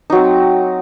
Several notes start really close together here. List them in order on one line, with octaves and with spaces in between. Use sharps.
D#4 F#3 C4